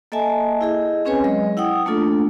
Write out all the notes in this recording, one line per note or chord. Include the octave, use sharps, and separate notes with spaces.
A#3 A4 D#5 E5 G#5 A5
E4 G#4 D#5
C4 C#4 G#4 B4 C#5 G#5
F#3 G#3 D#5
E4 F#5 G5 D#6
A3 A#3 D4 F4 A4